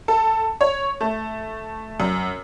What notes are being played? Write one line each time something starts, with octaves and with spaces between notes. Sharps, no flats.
A4
C#5
A3
F#2